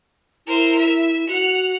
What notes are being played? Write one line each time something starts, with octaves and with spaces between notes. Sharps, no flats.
E4 A#4 C5
E5
F#4 F#5 F7